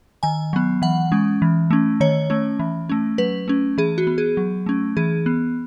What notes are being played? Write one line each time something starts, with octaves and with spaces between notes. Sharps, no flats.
D#3 G#5
F#3 B3
E3 F#5
G#3 C#4
E3
A3 C#4
D#3 C#5
A3 C#4
E3
A3 C#4
F#3 B4
A3 C#4
E3 G#4
F#4
B3
G#4
F#3
A3 C#4
E3 G#4
B3